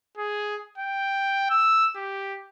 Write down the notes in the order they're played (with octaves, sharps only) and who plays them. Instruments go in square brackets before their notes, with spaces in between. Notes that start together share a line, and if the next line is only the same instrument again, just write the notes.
[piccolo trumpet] G#4
G5
E6
G4